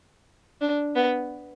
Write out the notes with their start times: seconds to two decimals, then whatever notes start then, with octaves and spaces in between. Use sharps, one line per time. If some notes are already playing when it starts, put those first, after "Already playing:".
0.61 D4
0.96 B3